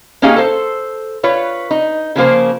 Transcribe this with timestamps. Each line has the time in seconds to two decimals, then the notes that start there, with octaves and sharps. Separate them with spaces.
0.22 A#3 C#4 D#4 G4 G#4 F5
0.36 A4 C5
1.23 F4 B4 C#5
1.71 D#4
2.16 C#3 F3 A#3 C5